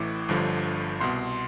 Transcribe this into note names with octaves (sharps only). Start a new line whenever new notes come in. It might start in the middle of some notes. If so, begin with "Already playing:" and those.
Already playing: A1 A2 E3 D6
G1 G2 D3 F3
C2 B2 C6